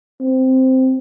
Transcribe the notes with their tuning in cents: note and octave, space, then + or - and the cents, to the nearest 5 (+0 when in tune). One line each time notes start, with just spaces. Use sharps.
C4 -5